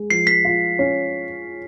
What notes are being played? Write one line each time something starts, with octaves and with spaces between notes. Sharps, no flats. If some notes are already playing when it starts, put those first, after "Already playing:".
Already playing: G#3
F3 C7
B6
F4
C#4